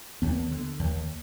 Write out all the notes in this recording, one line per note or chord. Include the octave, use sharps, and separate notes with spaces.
D#2 B3
D3
D#2